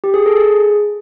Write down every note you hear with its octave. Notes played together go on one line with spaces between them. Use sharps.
G4
G#4
A4
G#4